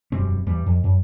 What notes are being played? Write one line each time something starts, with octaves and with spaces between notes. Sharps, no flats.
E1 F#2 G3 C4
E2 G3
F2
F#2